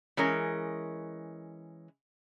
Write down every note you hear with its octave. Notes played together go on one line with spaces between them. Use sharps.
E3 G#3 C#4 A#4